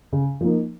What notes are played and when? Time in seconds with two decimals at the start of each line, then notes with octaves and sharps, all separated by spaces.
0.13 C#3
0.41 F3 A#3 D#4